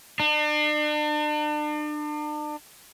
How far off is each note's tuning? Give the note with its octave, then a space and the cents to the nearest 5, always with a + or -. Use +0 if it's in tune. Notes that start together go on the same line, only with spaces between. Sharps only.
D4 +40